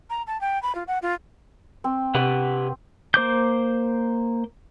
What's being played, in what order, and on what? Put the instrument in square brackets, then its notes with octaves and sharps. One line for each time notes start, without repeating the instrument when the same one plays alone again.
[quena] A#5
A5
G5
B5
F4
F#5
F4
[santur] C4
[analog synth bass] C3 [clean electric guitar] G4 B4 F#5
[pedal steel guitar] A#3 C5 D6 G6